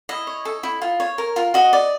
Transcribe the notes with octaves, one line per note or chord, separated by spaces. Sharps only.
E4 D#5
C#5
A4
E4
F4
C#5
A#4
F4
F#4 D#5
D5